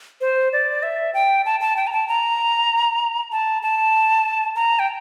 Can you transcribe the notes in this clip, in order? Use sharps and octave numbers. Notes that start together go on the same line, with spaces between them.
C5
D5
E5
G5
A5
A5
G5
A#5
A5
A#5
A5
A5
A#5
G5